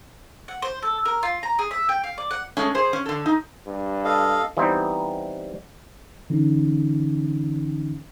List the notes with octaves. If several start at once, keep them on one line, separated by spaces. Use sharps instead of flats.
F#5
C5
A4
A#4
F4
A#5
G#4
E5
G5
F5
D5
F#5
G#3 A3 C#4
G#4 C5
C#4
D3 A4
D#4
G2
A4 D#5 F5
E3 G3 B3 C4 D#4 C5
D3 E3 C#4 D#4